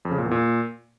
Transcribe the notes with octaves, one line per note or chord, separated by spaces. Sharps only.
F2
C#3
A#2
E2
A#2